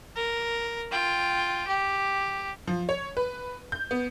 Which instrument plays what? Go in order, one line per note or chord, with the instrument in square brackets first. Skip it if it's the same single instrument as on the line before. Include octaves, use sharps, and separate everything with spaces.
[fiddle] A#4
F4 G5
G4
[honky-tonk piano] F3
C#5
B4
G6
B3